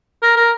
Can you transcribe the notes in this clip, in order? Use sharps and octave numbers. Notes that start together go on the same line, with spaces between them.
A#4
A#4